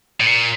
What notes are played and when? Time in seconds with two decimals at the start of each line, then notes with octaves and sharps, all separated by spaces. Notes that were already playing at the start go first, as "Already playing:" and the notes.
0.20 A2
0.26 A#2